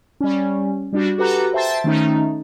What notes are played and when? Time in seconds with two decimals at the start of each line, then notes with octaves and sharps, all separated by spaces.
0.20 G3 C#4
0.93 G3 D4 F#4
1.18 F#4 G4 A4 B4 F#5 A#5
1.53 C5 E5 G5 A5 C6 A6
1.84 D#3 A3 C#4 D#4